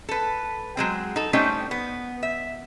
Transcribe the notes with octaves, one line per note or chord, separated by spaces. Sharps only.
A4 B4
F#3 G#3 C4
D#4 A4
G3 A3 C4 C#4 D#4
B3
E5